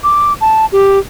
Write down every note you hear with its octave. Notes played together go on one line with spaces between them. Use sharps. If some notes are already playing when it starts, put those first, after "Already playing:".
D6
A5
G4